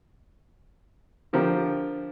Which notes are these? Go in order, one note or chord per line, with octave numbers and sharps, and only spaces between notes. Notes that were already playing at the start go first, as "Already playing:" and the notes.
D3 F3 G4 A#4